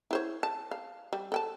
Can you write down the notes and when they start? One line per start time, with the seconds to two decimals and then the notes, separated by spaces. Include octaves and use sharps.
0.11 E4 C5 C#5
0.43 A5
0.71 F5
1.13 G3
1.32 A4 G5 A5